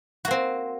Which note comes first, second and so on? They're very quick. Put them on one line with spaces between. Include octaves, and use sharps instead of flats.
F#4 A#3 C4